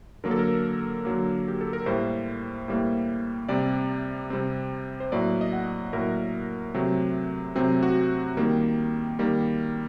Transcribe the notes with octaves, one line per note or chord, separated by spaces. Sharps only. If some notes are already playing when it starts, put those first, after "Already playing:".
D3 F#3 A#3 A#4
A4
A#4
D3 F#3 A#3
G4
A4
A#4
A2 G3 A#3 C5
A2 G3 A#3
C3 G3 C4 D5
C3 G3 C4
C5
A2 F#3 A#3 D5
D#5
F#5
A2 F#3 A#3 A#4
C3 F#3 A3 C4
C3 F#3 A3 C4
F#4
D#3 G3 A#3
D#3 G3 A#3